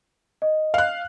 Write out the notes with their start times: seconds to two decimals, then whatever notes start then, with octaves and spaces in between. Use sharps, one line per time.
0.42 D#5
0.74 F5 F#6